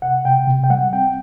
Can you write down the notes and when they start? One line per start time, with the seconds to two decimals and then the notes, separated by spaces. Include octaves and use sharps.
0.02 C3 F#5
0.25 C3 G5
0.47 C3
0.64 G5
0.70 G3 F#5
0.93 C4 G5